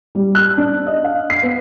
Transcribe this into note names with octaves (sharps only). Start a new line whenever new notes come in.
G3
F#6
D4
D#5
F5
C7
B3